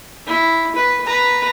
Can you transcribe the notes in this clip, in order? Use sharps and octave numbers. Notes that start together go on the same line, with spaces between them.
E4
B4
B4 A#5